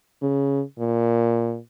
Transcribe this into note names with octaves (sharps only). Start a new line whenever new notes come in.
C#3
A#2